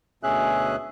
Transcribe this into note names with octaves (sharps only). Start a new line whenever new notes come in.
D2 B2 C#4 G#4 E5 F#6